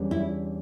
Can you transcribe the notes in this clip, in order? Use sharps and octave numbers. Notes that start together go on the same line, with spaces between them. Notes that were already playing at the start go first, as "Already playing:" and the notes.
Already playing: E2 D3 G3 C#4
E4